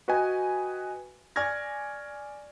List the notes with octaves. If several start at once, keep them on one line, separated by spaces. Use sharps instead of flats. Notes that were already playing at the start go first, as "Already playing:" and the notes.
F#4 B4 D#5 G5 G#5
D5 G#5 C#6 F6 G#6 A#6